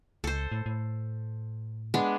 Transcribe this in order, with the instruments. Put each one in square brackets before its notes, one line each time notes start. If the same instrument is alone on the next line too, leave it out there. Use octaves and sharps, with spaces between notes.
[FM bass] C#2 [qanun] A4 C5
[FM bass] A2
A2
[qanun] G#3 B3 D4